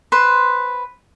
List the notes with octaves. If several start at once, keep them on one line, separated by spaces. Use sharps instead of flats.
B4 C5 C6